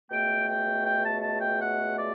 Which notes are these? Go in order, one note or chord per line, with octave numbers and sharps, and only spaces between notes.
C#2 B2 A3 G5
G5
G5
A5
A5
G5
F#5
D5